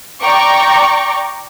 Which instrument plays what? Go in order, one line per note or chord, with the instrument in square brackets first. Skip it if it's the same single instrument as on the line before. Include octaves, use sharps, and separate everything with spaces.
[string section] D5 G5 A#5 C#6 D6